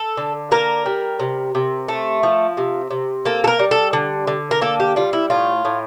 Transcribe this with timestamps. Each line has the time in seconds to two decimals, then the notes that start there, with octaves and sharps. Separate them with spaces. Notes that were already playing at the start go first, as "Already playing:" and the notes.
Already playing: A4
0.17 D3
0.51 A#3 A#4
0.86 G3
1.20 C3
1.55 C3
1.88 A3
2.23 F3
2.57 C3
2.90 C3
3.25 A#3 A4
3.44 A4
3.47 A#4
3.59 G3
3.71 A4
3.93 D3
4.27 D3
4.51 A#4
4.61 A#3 A4
4.80 G4
4.96 G3 F4
5.13 E4
5.30 A2 F4
5.65 A2